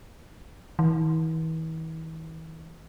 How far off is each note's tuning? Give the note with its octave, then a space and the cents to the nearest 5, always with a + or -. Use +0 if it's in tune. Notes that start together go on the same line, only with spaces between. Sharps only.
E3 -45